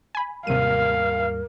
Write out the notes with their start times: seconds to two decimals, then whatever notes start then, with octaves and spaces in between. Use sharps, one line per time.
0.15 G#5 B5
0.47 D#2 G#2 C3 G3 A#4 F5 D#7